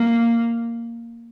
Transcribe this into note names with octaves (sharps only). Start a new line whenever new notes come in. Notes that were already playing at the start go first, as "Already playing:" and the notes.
Already playing: A#3